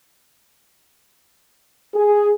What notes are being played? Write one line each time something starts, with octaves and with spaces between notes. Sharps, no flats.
G#4